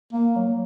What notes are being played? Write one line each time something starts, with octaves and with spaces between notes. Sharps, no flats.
A#3
F#3